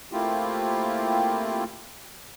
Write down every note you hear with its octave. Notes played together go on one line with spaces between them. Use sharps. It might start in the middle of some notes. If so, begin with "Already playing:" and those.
A3 A#3 C4 E4 F4 G4